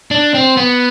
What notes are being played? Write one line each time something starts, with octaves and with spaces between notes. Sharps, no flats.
D4
C4
B3